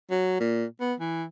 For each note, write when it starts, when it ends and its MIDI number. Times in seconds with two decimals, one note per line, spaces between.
0.11 0.37 54
0.40 0.65 46
0.80 0.94 59
1.00 1.24 52